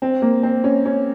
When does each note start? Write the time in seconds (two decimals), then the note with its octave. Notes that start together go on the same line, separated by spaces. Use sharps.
0.02 C4
0.22 A#3
0.43 C4
0.64 C#4
0.86 C#4